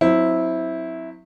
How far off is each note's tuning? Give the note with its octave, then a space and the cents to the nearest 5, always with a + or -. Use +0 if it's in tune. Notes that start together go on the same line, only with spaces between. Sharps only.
F#3 -20 C4 +0 E4 -10